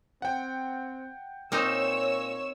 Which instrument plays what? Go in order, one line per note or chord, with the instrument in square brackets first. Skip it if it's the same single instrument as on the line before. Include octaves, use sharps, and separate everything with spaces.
[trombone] C4 [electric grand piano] F#5 G5
[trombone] A#2 [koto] A#3 C4 D#4 [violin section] C#5 E6